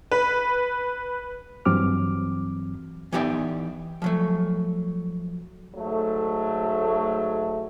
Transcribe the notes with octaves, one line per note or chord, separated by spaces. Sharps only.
B4
G2 E3 F#3 C4 D6 F6
E3 B3 D#4 G4 D5 E5
F3 F#3 A3
G#2 F#3 A3